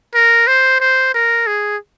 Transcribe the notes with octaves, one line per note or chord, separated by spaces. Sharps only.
A#4
C5
C5
A#4
G#4